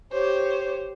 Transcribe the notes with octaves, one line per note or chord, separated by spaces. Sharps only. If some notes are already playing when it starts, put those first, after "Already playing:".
G4 C5 C#5